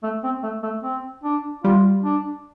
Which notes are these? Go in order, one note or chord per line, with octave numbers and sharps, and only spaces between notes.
A3
C4
A3
A3
C4
D4
G3 F4
D4